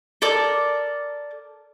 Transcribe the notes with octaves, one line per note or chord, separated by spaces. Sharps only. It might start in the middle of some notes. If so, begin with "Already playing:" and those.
A4 A#4 D5 D6